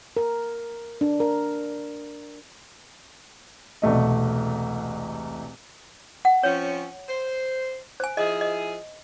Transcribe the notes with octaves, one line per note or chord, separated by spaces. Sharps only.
A#4
D4
A#4
E1 C2 A3 D#5
F#5
F3 C4 C#4 C#5
C5
C5 G#5
F3 E4 G#4 D#5
D#5